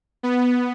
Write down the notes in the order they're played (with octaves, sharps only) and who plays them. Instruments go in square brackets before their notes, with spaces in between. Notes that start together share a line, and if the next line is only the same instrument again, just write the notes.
[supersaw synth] B3